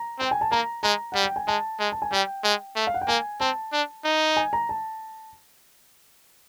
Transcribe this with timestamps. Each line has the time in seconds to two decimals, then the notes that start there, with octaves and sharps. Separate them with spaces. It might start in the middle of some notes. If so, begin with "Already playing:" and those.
Already playing: A#5
0.19 C4 G5
0.31 G#5
0.41 A5
0.51 A#3 A#5
0.83 G#3 A#5
1.12 G3 F#5
1.23 G5
1.36 G#5
1.48 G#3 A5
1.80 G#3
1.92 A5
2.02 G#5
2.11 G3 G5
2.44 G#3
2.76 A3
2.87 F5
2.94 F#5
3.01 G5
3.08 A#3 G#5
3.40 C4 A5
3.73 D4
4.05 D#4
4.37 G#5
4.53 A#5
4.69 A5